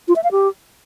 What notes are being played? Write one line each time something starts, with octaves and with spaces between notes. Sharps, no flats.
F4
E5
F5
G4